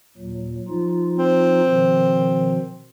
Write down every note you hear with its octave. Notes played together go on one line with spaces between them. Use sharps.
D#2 A#2 F#3
F3 D#4 F4
C4
B2 D#3 F3